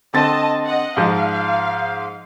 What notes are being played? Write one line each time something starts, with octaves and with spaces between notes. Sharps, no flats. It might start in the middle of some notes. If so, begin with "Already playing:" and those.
D3 C4 D#5 A5 A6
D#5 F#5
G#2 F3 F5